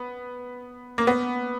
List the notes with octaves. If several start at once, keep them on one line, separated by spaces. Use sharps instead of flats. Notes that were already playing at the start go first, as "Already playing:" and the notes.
Already playing: B3
A#3
B3